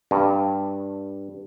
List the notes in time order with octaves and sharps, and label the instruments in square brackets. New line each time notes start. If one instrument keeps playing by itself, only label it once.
[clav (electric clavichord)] G2